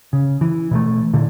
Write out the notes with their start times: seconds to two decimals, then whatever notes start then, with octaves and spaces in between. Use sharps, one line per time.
0.13 C#3
0.41 E3
0.71 B2 E3 F3 A3
1.13 A#2 D3 E3